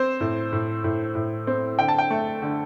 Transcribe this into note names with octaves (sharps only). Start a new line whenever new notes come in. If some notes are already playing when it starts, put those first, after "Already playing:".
Already playing: C4 C5
A2
A2
A2
A2
C4
D3 G5
A5
G5
A3
D3